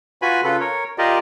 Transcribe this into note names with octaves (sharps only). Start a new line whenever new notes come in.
F4 F#4 B4 G#5 B5
C#3 F4 A4 B4
A#4 C#5
F4 G4 A#4 D5 D#5